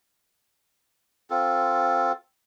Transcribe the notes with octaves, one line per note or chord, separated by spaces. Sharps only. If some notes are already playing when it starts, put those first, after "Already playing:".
C4 F4 A4